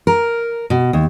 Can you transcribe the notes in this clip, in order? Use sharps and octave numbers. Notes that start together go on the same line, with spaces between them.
A#4
B2
D#2